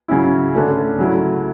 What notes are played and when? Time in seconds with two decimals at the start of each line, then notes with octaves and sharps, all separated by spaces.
0.08 C#3 F#3 C#4 E4
0.54 D3 A3 C#4
0.98 C#3 F#3 A3 E4